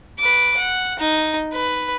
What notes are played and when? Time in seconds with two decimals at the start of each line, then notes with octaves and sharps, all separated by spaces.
0.19 B4 D6
0.57 F#5
1.00 D#4
1.53 B4